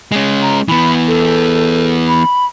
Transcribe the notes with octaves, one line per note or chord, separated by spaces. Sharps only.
G#3 C#4
A#5
E3 B3 B5
A4
B5